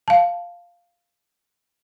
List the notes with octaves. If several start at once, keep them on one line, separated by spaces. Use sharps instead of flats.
F5 A5